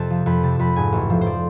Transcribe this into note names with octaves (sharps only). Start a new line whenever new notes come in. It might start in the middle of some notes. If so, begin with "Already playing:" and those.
Already playing: F2 C3 A5
F3
F2 B5
C3 A5
F2 B5
G#2 G#5
A1
F3
C5
D5